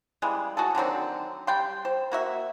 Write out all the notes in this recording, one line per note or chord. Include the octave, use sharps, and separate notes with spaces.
C#3 E3 G3 G#3
F#4 G#4 A4
D3 D#3 F#3 C4
G3 G5 C6
C5
A#3 F#4 E5